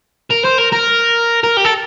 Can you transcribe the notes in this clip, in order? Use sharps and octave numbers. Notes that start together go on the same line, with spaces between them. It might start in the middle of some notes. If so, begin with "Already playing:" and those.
A#4
C5
A#4
A#4
A#4
G4
A4